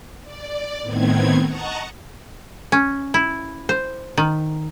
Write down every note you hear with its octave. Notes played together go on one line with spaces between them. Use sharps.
D5
A2 D#3 B3 C4 G#6
D#5 F#5 A5 A#5 C#6
C#4
E4
C5
D#3